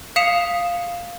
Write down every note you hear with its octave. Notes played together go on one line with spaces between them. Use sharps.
F5 D#6 B6 C#7 E7 F7